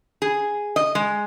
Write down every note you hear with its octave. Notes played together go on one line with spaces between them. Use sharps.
G#4
D#5
G#3